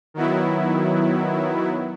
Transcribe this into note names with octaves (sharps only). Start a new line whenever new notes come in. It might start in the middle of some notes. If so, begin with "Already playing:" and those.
D#3 F#3 B3 E4